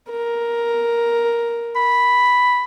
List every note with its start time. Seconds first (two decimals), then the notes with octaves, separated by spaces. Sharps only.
0.11 A#4
1.76 B5